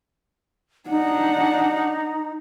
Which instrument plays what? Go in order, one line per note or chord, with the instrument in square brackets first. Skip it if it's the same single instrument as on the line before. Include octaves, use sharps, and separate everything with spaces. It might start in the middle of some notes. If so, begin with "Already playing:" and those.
[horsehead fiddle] D4 F#5 [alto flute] D#4